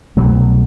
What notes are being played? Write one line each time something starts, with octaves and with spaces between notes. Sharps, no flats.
C2 B2 F#3 A3